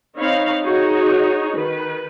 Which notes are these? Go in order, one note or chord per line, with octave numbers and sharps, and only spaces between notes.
C4 D#4 C#5 F5 B5
D#4 F#4 G#4 C#5
D#3 B4